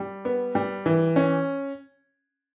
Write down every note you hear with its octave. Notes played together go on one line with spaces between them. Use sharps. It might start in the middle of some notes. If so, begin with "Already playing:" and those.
Already playing: G3
B3
G3
E3
C#4